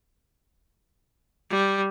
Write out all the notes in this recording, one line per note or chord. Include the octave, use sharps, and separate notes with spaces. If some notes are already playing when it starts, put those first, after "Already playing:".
G3